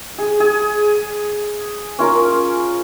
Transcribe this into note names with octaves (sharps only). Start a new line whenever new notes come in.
G#4
G#4
C#4 F4 A#4